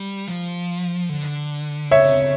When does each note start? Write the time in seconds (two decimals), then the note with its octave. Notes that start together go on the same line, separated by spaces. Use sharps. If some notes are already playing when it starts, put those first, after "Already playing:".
Already playing: G3
0.28 F3
1.09 D3
1.91 C#3 C#5 E5